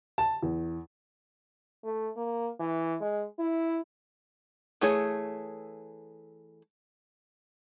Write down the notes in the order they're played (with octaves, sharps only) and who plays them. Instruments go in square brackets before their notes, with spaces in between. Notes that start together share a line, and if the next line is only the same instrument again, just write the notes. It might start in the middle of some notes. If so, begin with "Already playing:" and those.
[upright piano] A5
E2
[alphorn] A3
A#3
E3
G#3
E4
[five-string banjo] E3 A3 G#4 C#5